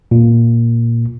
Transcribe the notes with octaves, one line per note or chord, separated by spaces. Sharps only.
A#2